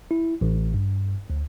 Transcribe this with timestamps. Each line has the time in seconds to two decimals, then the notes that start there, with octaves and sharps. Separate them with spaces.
0.11 E4
0.41 A1
0.74 G2
1.30 D2